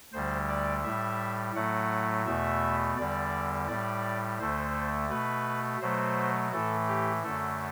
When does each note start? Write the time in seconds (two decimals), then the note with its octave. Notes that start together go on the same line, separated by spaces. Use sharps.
0.13 D2 D3 G3 C5
0.49 D5
0.84 A2 G3 E5
1.55 A2 F#3 A3 F#5
2.26 E2 B2 A3 E5
2.97 E2 D3 G3 D5
3.68 A2 G3 D5
4.39 D2 D3 A3 C5
5.10 B2 A3 B4
5.81 B2 F#3 A3 C5
6.52 A2 E3 A3 A4
6.87 G4
7.23 F#2 D3 A3 A4